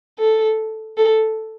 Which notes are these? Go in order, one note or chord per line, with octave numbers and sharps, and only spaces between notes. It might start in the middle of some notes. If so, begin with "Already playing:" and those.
A4
A4